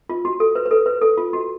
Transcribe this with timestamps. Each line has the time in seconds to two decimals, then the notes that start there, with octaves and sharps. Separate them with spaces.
0.09 F4
0.25 F#4
0.40 A4
0.55 B4
0.66 B4
0.71 A4
0.86 B4
1.02 A4
1.17 F4
1.33 F#4